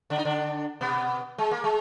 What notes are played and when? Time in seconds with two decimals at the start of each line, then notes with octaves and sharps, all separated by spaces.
0.10 D3 D4
0.18 D#4
0.25 D3 D4
0.81 B2 B3
1.38 G#3
1.51 A#3
1.64 G#3